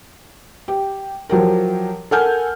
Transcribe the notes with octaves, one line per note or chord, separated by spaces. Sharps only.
G4
F3 F#3 G4 A#4
A4 A#4 F#5 G#5 F6 G6